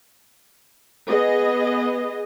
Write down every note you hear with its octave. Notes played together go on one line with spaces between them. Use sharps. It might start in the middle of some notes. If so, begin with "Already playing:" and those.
B3 G#4 D#5